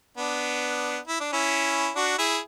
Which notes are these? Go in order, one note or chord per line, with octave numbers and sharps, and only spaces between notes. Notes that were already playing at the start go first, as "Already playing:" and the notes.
B3 D4
E4
D4
C#4 E4
D4 F#4
E4 G#4